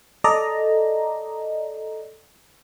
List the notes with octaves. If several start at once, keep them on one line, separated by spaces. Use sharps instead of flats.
A4 D5 D#5 A#5